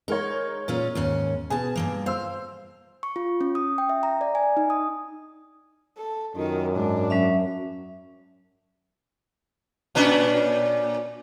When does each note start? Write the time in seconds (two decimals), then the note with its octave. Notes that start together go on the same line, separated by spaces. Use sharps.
0.08 G#3 D#4 A#4 C#5
0.68 A#2 C#4 F4
0.95 D#2 G#2 C#4
1.50 B2 G#4 G#5 A5
1.76 G2 A3 A#3
2.06 C5 F5 E6
3.03 C#6
3.16 F4
3.41 C#4
3.55 D#6
3.78 G5
3.89 E5
4.03 A#5
4.21 D5
4.35 G#5
4.57 D#4
4.70 D#6
5.98 A4
6.36 F#2 D#3 D#4 F4
6.76 G#2 G#3 D4
7.10 F#3 C#4 E5
9.95 A#2 C#4 D4